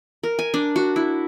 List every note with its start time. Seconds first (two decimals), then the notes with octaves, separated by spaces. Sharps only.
0.23 A#4
0.39 G#5
0.54 D4
0.76 F#4
0.96 E4